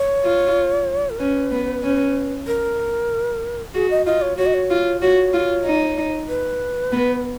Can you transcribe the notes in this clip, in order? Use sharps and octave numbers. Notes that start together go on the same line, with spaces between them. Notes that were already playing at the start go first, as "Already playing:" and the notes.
Already playing: C#5
F4
A#4
C#4 B4
B3
C#4
A#4
F#4 G#4
D#5
F4 D#5
C#5
F#4 C#5
D#5
C#5
F4
F#4 C#5
F4
D#4
B4
B3